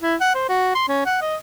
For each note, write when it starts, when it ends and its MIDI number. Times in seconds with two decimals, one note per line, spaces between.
0.02 0.15 64
0.21 0.34 78
0.35 0.45 72
0.49 0.71 66
0.75 0.85 84
0.88 1.04 61
1.06 1.21 78
1.21 1.36 75